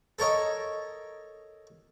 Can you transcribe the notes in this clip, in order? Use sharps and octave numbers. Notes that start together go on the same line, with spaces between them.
A4 A#4 C#5 D#5